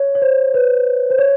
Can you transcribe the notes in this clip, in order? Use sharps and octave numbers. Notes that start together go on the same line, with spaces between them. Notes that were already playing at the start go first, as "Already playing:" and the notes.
Already playing: C#5
C#5
C5
B4
C5
C#5